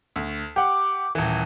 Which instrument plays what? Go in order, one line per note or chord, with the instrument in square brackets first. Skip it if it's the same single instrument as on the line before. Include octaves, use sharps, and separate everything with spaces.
[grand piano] D2
[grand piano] G4 F#5 [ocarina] D6
[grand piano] D#1 E3